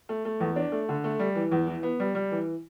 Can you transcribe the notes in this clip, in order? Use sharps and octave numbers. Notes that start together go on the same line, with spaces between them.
A3
A3
E2
D4
A3
D3
A3
G3
E3
E2
E3
B3
G3
G3
E3